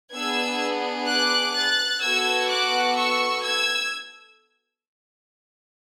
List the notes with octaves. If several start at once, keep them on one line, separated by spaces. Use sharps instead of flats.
B3 D4 G#4 E6 G#6
D6 F#6
F#6 A6
B3 F#4 A4 E6 G#6
D6 F#6
C#6 E6
E6 G#6